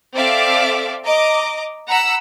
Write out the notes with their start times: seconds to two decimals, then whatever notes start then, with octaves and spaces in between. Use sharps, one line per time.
0.15 C4 A4 D5 E5 F5 D6
1.05 D#5 A#5 D6
1.87 F#5 A#5 B5 E6